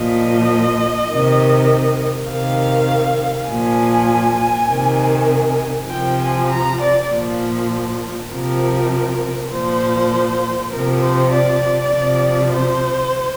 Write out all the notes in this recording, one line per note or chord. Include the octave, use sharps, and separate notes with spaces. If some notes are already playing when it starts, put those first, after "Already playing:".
Already playing: A#2 F3 D#5
C3 D#3
C3 D#3 F5
A#2 F3 G#5
C3 D#3
C3 F3 G5
G#5
A#5
D5
A#2 F3
C3 F3 A#4
A#2 F3 C5
C3 F3 A#4
C5
D5
D5
C3 F3
C5